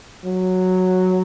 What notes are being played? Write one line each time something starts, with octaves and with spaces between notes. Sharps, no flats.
F#3